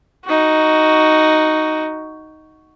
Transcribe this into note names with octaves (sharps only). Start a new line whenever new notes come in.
D#4 F#4